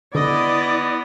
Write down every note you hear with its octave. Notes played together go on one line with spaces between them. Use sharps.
D3 B3 E4 D5 D#5